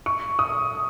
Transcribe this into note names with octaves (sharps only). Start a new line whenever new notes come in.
C#6
D#6